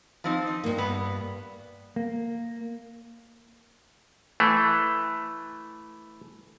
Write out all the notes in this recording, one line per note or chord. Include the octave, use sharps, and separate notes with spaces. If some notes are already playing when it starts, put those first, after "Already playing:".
F3 C4 D#4
D#4
G2 A#3
B3
A#3
E3 A3